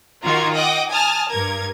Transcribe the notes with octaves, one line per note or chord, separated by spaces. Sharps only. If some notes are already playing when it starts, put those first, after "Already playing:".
D#3 F4 F#4 A#5 C6 G#6
D#5 F#5 G5 D6
G#5 A5 D#6 F6 A6
G2 A#4 G#6